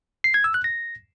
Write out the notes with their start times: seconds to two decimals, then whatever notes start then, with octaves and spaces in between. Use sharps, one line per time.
0.24 C7
0.34 G#6
0.44 E6
0.54 F#6
0.64 A#6